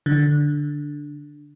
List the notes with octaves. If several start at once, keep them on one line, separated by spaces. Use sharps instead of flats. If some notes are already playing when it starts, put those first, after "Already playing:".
D3